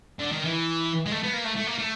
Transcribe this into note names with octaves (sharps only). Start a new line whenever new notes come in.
D3
D#3
E3
G#3
A3
B3
A#3
A3
A3
A#3
A3